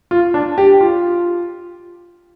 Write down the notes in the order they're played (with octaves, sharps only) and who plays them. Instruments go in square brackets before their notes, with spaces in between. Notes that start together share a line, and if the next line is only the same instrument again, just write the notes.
[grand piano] F4
D4
G4
F4